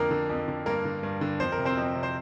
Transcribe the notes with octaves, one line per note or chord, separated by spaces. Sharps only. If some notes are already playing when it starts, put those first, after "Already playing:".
Already playing: F2 D3 A#3 A#4
D3
F2
D3
G2 A#3 A#4
D3
G2
D3
F2 C5
A#4
C3
C4 C5
F2
C3
C5